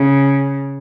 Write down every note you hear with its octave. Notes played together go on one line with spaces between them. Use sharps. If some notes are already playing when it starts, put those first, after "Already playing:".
Already playing: C#3